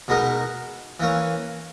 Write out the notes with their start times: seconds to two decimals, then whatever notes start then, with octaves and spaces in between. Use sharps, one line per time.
0.08 B2 G#3 B3 D#4 A#4
1.00 E3 A#3 C#4